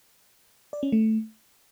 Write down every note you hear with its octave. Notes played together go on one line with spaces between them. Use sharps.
D5
C#4
A3